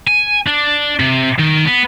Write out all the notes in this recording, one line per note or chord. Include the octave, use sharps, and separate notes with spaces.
G#5
D4
C3
D#3
B3